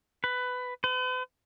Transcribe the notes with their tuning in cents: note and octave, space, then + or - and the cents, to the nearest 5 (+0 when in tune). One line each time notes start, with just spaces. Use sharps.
B4 +15
B4 +45